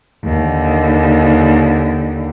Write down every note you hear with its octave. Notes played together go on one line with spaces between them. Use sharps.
D#2 D3